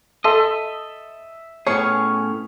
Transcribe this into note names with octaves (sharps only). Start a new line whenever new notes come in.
A4 D#5 E5 C6
A2 B3 C#4 G#4 C#5 F5 C#6